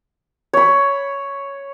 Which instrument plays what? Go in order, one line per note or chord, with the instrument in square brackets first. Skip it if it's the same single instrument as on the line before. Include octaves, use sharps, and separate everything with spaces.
[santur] C#5 B5